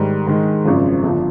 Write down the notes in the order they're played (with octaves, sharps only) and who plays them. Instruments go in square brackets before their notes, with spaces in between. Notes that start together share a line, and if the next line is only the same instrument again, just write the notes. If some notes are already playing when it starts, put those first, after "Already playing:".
Already playing: [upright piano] G#2 D#3 G3
G#2 D#3 G#3
G#1 F#2 C#3 F3
G1 F2 D3 F3